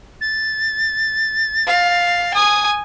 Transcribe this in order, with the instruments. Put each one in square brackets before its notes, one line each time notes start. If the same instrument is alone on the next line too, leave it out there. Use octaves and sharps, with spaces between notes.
[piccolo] A6
[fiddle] F5
G#5 D#6